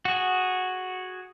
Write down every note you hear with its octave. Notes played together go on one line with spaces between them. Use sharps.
F#4 G#4